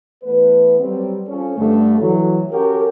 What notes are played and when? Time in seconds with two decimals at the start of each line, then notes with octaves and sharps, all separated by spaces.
0.24 E3 A3 B3 B4
0.80 F#3 G3 C4
1.28 F3 C#4 A4
1.58 G2 D3 A3
2.00 E3 F#3
2.52 C#4 F#4 G4 A4 A#4